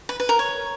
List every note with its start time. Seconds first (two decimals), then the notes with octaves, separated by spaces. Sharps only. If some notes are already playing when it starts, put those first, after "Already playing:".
0.09 B4
0.20 B4
0.29 A#4
0.39 C#5